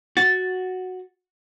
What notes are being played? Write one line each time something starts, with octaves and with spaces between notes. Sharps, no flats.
F#4 A6